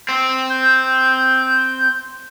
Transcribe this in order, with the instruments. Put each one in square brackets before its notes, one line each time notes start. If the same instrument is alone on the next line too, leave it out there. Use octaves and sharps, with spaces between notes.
[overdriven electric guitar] C4
[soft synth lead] G6